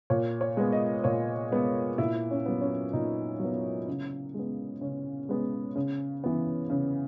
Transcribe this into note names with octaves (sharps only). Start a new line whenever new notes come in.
A#2 C#5
C#5
G#3 B3
D#5
A#2 C#5
G#3 B3
A#2 E4
C#4
F#3 B3
C#4
A#2 D#4
F#3 B3
C#3
G#3 B3
C#3 C#4
G#3 B3
C#3
E3 B3
C#3